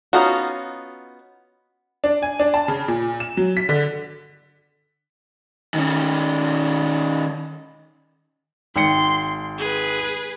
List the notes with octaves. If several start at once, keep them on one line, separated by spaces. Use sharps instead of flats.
B3 C#4 D#4 F4 F#4
D4
G#5
D4
A5
C#3
A#2
E7
F#3
B6
D3
D#3 C#4
G#1 G5 C6 C#7
G#4 B4